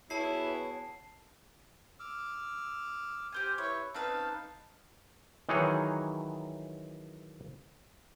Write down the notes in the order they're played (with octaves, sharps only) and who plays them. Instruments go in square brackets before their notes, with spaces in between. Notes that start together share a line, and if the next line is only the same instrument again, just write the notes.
[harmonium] B3 F#4 G#4 [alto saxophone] E4 [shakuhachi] C#5 [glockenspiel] A5 C7
[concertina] D6 E6 F6
[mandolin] G4 C5 G#5 [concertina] F6
[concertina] E4 B4 E5 [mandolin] C#5
[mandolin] C4 C#4 B4 [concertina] D#4 F5 A5
[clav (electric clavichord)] D#3 E3 F#3 D#4 G#4 C#5